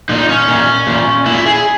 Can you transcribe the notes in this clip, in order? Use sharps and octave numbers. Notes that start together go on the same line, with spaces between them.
A#2 D#4
C#4
A#2
A#2
A#2 E4
G#4